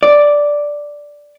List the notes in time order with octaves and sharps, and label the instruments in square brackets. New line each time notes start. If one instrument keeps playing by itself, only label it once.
[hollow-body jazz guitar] D5